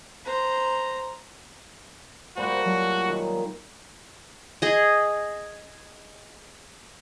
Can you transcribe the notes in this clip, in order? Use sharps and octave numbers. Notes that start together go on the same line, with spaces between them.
C5 A#5
A#2 G3 A3 F#4 C5
F#3
D#3
G#4 D#5